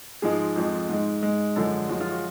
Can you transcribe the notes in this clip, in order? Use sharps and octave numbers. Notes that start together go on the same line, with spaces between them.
G#2 F3 G#3 G#4
F2 F3 G#3
G#2 G#3
G#2 G#3
F#2 D3 F3 G#3 A4
F#2 F3 G#3 F#4
F4
F#4